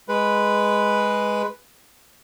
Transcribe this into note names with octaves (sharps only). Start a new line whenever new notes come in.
G#3 B4